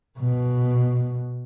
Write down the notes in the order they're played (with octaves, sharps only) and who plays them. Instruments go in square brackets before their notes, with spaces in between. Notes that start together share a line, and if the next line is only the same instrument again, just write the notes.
[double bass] B2